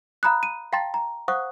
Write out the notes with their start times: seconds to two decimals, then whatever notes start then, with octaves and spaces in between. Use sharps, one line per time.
0.23 F5 A#5 B5 D#6 F#6
0.43 D#7
0.73 F5 G5 A5 A#5 C6 A6
0.94 A#5
1.28 C5 F5 F#5 C#6 D#6 F#6